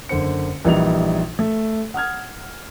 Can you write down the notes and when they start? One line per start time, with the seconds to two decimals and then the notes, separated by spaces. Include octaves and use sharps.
0.09 F#1 D3 C5 C#7
0.65 A#1 E3 G3 D#4 F7
1.39 A3
1.94 F#5 D#6 F6 G#6